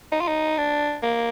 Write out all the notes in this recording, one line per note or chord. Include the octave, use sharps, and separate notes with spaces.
D#4
F4
D#4
D4
A#3